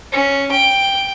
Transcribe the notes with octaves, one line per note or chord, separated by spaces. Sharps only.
C#4
G5